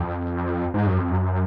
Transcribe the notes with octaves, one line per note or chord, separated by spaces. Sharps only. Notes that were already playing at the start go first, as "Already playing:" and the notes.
Already playing: F2
G#2
F#2
F2
F#2